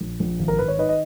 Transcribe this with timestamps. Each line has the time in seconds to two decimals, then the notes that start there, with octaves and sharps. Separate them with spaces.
0.01 A#1
0.20 A#1
0.39 G#1
0.48 A#4
0.58 G#1 B4
0.68 C#5
0.79 D#3 B4 D#5
0.89 D#5